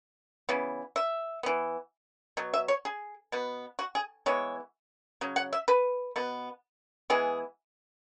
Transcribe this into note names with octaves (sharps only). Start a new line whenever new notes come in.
C#3 E3 B3
E5
E3 B3
B2 F#3
E5
C#5
G#4
B2 B3
F#4
G#4
E3 G#3 B3 C#5
C#3 F#3
F#5
E5
B4
B2 B3
E3 G#3 B3 G#4